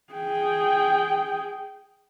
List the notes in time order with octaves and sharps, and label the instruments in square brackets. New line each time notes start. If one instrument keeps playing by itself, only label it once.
[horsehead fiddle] G#4 G5